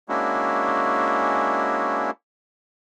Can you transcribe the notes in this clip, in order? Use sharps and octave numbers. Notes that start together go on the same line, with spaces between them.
G#3 A#3 C#4 D4 E4 F#4